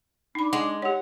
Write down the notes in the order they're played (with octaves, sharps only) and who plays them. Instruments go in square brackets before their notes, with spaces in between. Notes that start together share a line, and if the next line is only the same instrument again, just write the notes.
[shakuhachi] D4 [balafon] D#4 B5
[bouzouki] G#3 [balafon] F#5
[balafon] G4 C#5 [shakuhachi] F#5